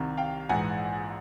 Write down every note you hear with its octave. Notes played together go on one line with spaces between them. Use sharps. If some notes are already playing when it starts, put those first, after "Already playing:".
Already playing: C2 C3 D#3
F5 G5
A#1 G#2 E3 F#5 G#5